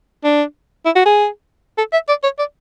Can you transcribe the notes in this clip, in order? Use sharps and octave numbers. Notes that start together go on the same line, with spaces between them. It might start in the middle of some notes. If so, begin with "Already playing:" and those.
D4
E4
F#4
G#4
A4
E5
D5
C#5
D5